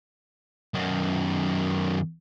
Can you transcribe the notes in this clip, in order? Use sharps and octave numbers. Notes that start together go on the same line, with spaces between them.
F#2 D#3